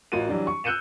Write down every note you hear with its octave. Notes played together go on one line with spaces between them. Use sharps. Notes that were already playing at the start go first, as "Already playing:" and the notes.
A1 F4 F#4 A#4 D#7
E3 F#3 G3 D4
C#6
E6 F#6 G6 C#7 D#7 E7